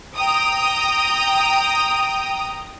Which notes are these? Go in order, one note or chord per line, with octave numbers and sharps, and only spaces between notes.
G5 A#5 D#6